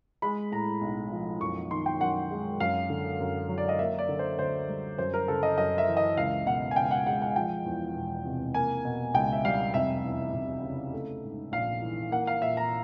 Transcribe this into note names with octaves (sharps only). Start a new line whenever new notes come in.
G#3 B5
A2 A#5
B1
F3
F#2 C#6
D#3 C6
G5
F#2 F#5
G#3
F#2 F5
D3
F#2
F#3
D5
D#5
A#3 E5
D5
D3
C5
D2 C5
G3
F#2 C5
A#4
C#3 A4
D#5
F#2 D#5
E5
E3
D#5
C#2 F5
B2 F#5
G#5
C#2 G5
F#5
G#3 F#5
F#5
F3 G5
E2
E1
C3
A#3 G#5
B2
C#2 G5
E5
G3 F5
F1 E5
E2
F1
C#3
A3
G#2
A#1 F5
E3
A#3 F#5
F5
A#2 E5
A#5